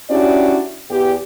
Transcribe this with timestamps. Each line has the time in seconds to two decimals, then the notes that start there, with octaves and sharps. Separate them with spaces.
0.10 C#4 D4 E4 F#4 G4 D5
0.91 E2 G4